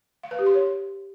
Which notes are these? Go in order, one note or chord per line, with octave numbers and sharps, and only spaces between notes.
F5
B4
G4
C6
C#5